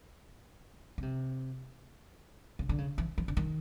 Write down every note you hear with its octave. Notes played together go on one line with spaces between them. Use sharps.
C#3
C3
C#3
D3
C#3
E3
E3
D3
D#3